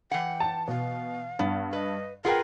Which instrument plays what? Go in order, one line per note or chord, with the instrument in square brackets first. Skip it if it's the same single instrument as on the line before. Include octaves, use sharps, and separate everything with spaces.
[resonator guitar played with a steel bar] E3 F#5 [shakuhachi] G5
[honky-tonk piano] A5
[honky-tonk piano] B2 [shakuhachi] F5
[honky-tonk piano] G2 [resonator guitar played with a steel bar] B3
[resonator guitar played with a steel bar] B4 [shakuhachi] D#5
[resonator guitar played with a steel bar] F4 G#4 B4 [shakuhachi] A#4 [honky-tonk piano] F#5 G5